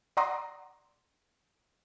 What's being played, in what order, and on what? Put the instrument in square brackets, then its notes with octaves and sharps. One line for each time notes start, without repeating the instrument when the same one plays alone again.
[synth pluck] D5 F#5 A#5 C6 D6 D#6